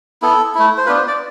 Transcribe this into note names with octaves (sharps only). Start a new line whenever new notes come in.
B3 E4 A4
A3 E4
C5
B3 D4 F4 B4
C5
D5